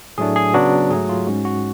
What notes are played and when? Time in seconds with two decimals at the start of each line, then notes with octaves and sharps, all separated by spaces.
0.18 A2 F#3 A3 D4 G#4
0.36 G#4
0.54 C#3 F#3 B3 D4 F#4
0.90 G#2 F#3 A3 G#4
1.09 F4
1.27 G#2 G#3 C#4 F#4
1.45 F#4